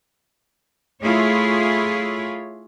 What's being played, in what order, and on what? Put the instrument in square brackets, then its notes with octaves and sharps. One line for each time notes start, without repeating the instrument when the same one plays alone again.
[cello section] A3 E4 F4 G#4 C#5